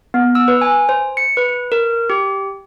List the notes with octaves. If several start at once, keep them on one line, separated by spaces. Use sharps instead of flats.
B3
E6
B4
G#5
C5
C#7
B4
A#4
G4